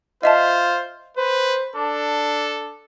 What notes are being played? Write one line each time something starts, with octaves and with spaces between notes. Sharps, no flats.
F4 C5 D#5 E5 A5
B4 C5
D4 A4